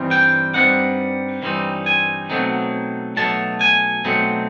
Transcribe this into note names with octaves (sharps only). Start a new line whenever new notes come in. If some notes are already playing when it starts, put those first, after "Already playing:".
Already playing: G2 E3 G3 C4 D#4
G5
G2 E3 G3 C4 D#4 F#5
G2 E3 G3 C4 D#4
G#5
B2 F#3 A3 C4 D#4
B2 F#3 A3 D#4 A5
G#5
B2 F#3 A3 C4 D#4